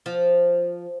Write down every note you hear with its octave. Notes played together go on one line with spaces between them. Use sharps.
F3